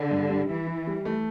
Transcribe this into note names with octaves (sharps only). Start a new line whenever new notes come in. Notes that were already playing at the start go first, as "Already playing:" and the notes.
Already playing: D3
G2
G3
E3 E4
E4
G3
A3